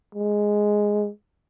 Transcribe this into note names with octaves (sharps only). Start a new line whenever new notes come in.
G#3